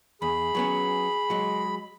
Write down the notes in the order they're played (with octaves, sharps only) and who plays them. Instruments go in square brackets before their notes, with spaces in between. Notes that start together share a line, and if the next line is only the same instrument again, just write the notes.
[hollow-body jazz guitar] E2 [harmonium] G#4 [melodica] B5
[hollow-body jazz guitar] F#3 B3 C#4
F#3 G#3